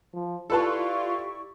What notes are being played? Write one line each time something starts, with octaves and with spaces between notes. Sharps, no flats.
F3
E4 F4 G4 A4 B4 D5 A5 C#6